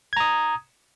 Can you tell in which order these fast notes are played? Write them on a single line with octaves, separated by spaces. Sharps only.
G#6 A#5 D#6